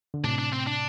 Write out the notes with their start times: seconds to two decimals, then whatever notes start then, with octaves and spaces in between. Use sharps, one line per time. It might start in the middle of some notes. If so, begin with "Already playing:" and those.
0.14 D3
0.24 A2 C3 D4
0.38 D4
0.53 C4
0.67 D4